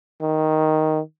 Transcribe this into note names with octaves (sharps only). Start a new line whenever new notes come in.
D#3